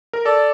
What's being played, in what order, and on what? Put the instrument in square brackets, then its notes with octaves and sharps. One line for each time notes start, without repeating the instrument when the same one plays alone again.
[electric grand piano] A#4
[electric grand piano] A4 [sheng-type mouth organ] D5